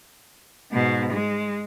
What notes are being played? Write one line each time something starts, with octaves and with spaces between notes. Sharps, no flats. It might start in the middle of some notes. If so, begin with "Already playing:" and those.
G#2 B2
G#3